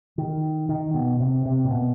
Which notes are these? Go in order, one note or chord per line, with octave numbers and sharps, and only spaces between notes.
D#3
D#3
B2
C3
C3
A#2
B2